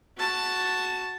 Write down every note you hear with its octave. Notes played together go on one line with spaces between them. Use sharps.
F#4 A5